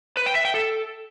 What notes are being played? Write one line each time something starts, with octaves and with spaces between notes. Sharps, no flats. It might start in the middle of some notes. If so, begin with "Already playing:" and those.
B4
G5
E5
G5
A4